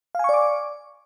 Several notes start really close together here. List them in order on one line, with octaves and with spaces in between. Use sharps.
F5 G#5 C#6 D5 D6